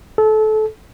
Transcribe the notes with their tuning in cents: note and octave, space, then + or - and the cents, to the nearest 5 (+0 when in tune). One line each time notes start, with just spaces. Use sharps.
A4 -25